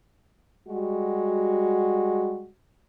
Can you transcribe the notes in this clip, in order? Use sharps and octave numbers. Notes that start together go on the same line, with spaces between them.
G3 G#3 F#4